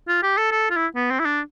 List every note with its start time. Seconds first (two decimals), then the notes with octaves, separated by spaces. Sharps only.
0.08 F4
0.23 G4
0.38 A4
0.51 A4
0.70 F4
0.76 E4
0.96 B3
1.11 C4
1.20 E4
1.25 D4